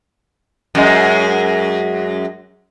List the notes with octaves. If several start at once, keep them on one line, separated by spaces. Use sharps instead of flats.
F#2 G#3